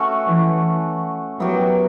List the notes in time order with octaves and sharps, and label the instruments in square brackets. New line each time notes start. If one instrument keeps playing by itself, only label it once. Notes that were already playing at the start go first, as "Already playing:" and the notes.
Already playing: [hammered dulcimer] A3 C#4 F#4
[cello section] E3
[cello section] F#3 [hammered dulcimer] B3 E4 G4 A#4